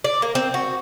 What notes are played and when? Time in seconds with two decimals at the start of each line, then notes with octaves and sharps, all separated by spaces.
0.04 D5
0.22 A#3
0.35 C4
0.54 F#4